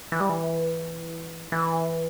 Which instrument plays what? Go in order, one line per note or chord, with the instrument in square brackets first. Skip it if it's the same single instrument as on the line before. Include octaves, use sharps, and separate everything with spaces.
[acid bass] E3
G3
E3
E3